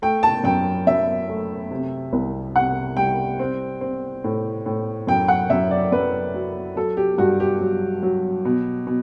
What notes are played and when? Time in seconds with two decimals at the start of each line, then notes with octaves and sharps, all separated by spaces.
0.02 A3 G5
0.23 A5
0.44 F#2 G5
0.87 F#2 E5
1.29 A3
1.70 C3
2.13 C2
2.55 C3 F#5
2.97 G3 G5
3.39 C4
3.81 C4
4.24 A2
4.66 A2
5.07 F#2 G5
5.28 F#5
5.50 F#2 E5
5.71 D5
5.92 F#2 B4
6.34 F#3
6.76 F#3 A4
6.97 G4
7.18 G2 F#4
7.40 G4
7.60 F#3
8.03 F#3
8.45 B2
8.87 B2